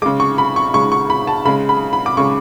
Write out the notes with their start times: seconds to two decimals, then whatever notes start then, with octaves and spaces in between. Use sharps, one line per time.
0.02 G#3 D6
0.06 C#3
0.20 C#6
0.38 B5
0.56 C#6
0.73 C#3 G#3 C#6
0.92 C#6
1.10 B5
1.27 A5
1.45 C#3 G#3 B5
1.69 B5
1.93 B5
2.06 D6
2.17 C#3 G#3 C#6